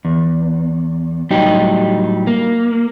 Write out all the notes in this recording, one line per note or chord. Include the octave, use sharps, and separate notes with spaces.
E2
A2 F#3 G3 D#4 G4
A#3